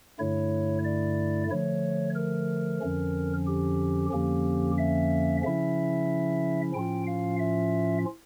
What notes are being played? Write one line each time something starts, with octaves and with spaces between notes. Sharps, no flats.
G2 D3 A3 E4 C#5
D5
D3 F3 A3 C#5
A#4
F2 D3 F3 C#4
G4
F2 D3 F3 A#3 C#4 G4
E5
C#3 F3 C#4 E4 E5
A2 F3 C#4 F4 G5
F5
E5